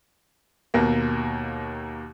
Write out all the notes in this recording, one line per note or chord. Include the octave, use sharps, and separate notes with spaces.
D#2 B2 A#3